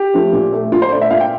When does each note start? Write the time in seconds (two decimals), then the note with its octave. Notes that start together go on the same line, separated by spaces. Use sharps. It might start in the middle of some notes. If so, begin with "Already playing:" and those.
Already playing: G4
0.14 F3 A3
0.33 A#2
0.52 A3
0.72 A#2 F4
0.82 C5
0.91 A3 D5
1.01 E5
1.10 A#2 F5
1.20 G5